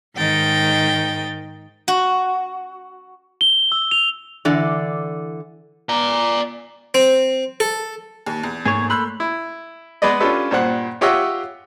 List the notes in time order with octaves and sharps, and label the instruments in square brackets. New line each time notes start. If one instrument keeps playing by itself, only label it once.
[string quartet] G#2 D#3 D#4 G5 A6
[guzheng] F#4
[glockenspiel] G7
E6
F7
[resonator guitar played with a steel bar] D3 E3 D5
[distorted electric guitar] D5 A#5
[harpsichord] C4
A4
[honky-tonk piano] D#2
E2
[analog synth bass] G#2 [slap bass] A3 A#3 [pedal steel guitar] G#4 C#5
[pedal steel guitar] A4 B5 F#6 [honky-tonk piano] C6 E6 G6
[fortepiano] E4
G#3 B3 G#4 B4 D5 D#5
C#4 D4 F4 G4 A4 B4
G2 A#2 C5 F#5
F4 G4 C#5 D#5 E5 F#5